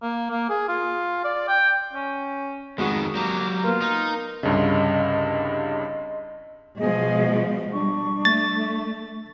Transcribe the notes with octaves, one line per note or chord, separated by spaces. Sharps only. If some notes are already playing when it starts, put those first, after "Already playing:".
A#3
A#3
G#4
F4
D5
G5
C#4
F2 D#3 G#3 B3 F#4
F#3 A#3 G4
A#3 B3 F4
D#4
C2 G2 C#3 D#5 C6
B2 F3 G#3 G#4 D#5
G3 D4 C#6
A3 A6